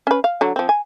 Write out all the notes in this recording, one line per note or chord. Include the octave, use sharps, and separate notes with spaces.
C#4 B4
F5
D3 F#3
F3 C4
G#5